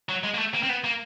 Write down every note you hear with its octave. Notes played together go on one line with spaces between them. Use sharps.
F#3
G#3
A#3
A3
A#3
C4
B3
A#3